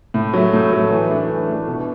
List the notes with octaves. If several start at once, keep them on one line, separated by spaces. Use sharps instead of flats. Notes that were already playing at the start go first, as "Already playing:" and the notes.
A2
F#3 A3
A2
F#3 A3
E3
A3 D4
E3
A3 D4
B2